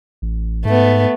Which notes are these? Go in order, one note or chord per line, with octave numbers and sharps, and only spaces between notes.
A1
G#2 A3 B3